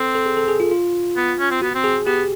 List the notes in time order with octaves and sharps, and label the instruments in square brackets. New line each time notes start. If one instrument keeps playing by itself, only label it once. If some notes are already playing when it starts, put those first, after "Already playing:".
Already playing: [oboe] C4 [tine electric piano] A4
[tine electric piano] A4
G#4
A4
G#4
F4
F4
[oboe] B3
C#4
C4
[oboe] B3 [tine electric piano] F#4
[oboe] C4
[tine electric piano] G#4
[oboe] B3 [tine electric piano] G4